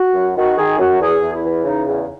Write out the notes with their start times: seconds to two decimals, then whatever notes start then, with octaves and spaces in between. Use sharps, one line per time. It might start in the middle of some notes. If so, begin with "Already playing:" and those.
Already playing: F#4
0.14 F#2
0.36 D#3 F#4
0.57 D#3 G#4
0.79 F#2 F#4
1.00 E2 G#4
1.22 E2
1.33 E4
1.44 E3
1.64 C#3 D#4
1.86 E2